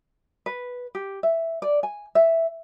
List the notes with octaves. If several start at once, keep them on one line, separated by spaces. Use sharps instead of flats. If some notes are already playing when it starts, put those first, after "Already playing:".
B4
G4
E5
D5
G#5
E5